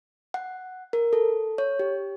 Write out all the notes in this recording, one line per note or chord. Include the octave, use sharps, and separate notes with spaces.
F#5
A#4
A4
C#5
G4